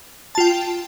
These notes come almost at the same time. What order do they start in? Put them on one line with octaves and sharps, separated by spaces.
A5 F4 G5